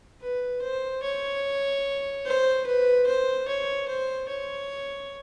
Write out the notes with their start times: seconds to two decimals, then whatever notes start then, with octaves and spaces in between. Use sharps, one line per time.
0.22 B4
0.62 C5
1.03 C#5
2.25 C5
2.66 B4
3.06 C5
3.48 C#5
3.88 C5
4.29 C#5